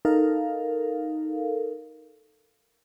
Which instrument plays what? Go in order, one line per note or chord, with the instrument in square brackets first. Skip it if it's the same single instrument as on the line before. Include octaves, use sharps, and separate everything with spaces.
[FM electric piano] D#4 A4 A#4 F5